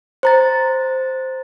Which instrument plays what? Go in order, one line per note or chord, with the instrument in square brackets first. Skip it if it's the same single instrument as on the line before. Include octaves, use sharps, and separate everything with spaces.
[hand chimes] C5 A#5 A6